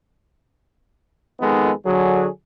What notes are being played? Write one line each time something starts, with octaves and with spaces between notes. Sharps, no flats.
F2 D#3 G#3 B3 D#4 A4
D3 F#3 G#4